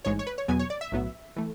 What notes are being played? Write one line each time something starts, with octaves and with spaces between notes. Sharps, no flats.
A1 G#2 G#3 C#5
C#5
B4
C#5
E2 B2 F#3 B3 G#5
C#5
D5
E5
B1 A2 F#3 B3
E3 A3